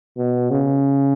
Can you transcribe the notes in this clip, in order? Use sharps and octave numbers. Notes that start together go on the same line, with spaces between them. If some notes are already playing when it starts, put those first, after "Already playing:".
B2
C#3